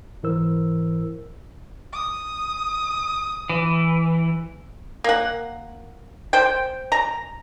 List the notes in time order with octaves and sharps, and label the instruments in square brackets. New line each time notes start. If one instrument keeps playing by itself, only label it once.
[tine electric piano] G#2 E3 E4 A#4 C5 E6
[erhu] D#6
[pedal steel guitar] E3
[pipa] A#3 F#5
C5 G5
A#5